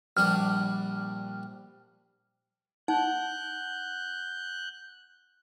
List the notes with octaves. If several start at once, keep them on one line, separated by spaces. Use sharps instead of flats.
A#1 G3 D4 F6
D#4 F#5 F#6 G6